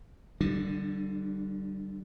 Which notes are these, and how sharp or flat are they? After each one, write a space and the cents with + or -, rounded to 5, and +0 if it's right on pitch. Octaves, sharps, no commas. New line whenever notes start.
D3 +0 G3 -25 D4 +45